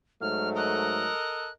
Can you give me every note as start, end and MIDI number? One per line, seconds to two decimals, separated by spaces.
0.21 1.09 44
0.21 1.09 54
0.21 1.09 57
0.21 0.49 89
0.57 1.49 69
0.57 1.49 70
0.57 1.49 75
0.57 1.51 90